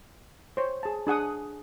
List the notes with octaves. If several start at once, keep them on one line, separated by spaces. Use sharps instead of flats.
C5 C#5
G#4 A5
D4 G#4 F#5 D#6